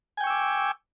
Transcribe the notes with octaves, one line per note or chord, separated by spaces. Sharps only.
G5 G#5 C#6 D6 E6